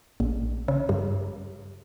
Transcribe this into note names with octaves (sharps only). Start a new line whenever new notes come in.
A#1
C#3
G2